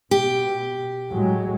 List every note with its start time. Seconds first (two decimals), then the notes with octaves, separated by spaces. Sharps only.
0.11 B2 G4
1.09 A2 F#3 G#3